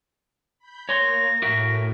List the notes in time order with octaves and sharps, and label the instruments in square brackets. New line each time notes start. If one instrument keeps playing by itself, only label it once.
[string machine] B5 G6
[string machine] A#3 [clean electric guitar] C#5 C6 [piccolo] A#6
[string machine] A2 [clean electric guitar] F#4 A#4 E5